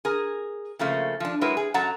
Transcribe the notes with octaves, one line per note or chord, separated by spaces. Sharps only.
G#4 A#4
C#3 F3 A3 A#3
F3 D4
F#3 G#3 E4 A#4 B4
G#4
F#2 F#3 A4 F#5 A#5